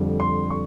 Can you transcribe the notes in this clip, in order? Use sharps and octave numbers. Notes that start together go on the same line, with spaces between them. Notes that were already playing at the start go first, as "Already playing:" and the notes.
Already playing: F2 D3 G3
C6
C#6